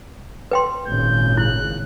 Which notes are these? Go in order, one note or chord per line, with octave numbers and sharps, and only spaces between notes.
B4 G5 C6
G#1 A#2 C#3 G6
E4 F#6